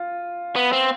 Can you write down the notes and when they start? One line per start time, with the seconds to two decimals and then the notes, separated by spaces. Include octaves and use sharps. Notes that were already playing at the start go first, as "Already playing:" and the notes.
Already playing: F4
0.56 B3
0.72 C4